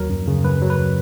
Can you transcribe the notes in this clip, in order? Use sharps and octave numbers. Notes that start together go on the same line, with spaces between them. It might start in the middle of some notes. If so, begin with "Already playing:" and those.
Already playing: D#2 F#3 A#4
F#2
C#3
F#2 B4
F#3
B4